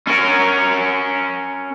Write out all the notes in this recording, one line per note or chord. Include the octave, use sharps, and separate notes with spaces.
C#4 A#4